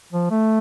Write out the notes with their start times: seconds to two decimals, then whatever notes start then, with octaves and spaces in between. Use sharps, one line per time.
0.13 F3
0.31 A3